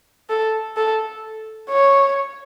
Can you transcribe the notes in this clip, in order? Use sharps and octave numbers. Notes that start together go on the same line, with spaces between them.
A4
A4
C#5